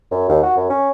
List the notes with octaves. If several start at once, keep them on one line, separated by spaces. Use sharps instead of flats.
F#2
D#2
F#4
F#2
C#4